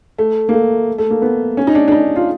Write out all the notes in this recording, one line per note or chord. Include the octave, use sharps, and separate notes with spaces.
A3
A#3
A3
A3
A#3
B3
C#4
D#4
D4
D4
D#4
F4